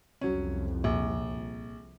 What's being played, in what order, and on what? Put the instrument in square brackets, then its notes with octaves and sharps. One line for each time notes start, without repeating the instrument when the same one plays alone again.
[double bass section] C2 F2 [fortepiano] F#3 C#4
[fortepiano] A#1